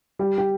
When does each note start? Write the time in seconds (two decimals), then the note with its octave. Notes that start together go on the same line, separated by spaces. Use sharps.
0.19 G3 G4
0.38 G4